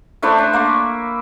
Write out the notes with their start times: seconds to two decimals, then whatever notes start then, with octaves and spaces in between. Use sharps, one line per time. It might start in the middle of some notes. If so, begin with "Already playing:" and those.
0.22 A3 D4 E4 C5
0.38 D4
0.53 A#3 C#6